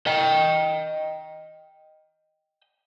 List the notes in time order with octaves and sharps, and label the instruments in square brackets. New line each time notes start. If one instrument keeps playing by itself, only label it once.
[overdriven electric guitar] D#5 G5